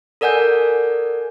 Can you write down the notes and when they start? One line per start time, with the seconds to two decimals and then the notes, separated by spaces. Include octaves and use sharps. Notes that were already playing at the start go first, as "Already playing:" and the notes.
0.21 A4 A#4 D5 F#5 G#5 G6